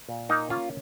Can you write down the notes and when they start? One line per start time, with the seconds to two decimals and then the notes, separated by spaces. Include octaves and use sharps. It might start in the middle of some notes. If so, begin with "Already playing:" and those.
0.09 A#2
0.29 A#3 D#4
0.50 C#4 F4